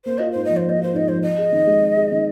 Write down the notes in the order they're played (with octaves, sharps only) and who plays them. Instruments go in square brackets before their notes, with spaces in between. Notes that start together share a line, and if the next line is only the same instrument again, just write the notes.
[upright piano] A#3 [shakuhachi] C5
[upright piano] F4 [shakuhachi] D#5
[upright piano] G#2 [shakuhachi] C5
[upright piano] F3 [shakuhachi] D#5
[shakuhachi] C5
[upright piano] A#3 [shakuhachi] D#5
[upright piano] F4 [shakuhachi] C5
[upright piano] G#2 [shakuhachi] D#5
[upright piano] F3 [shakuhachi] C5
[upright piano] C4 [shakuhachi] D#5
[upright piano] G#4
D#3
G#3
C4
G#4
D#3